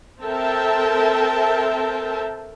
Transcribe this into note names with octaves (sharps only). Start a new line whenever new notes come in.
C4 A4 A#4 E5 G5 A5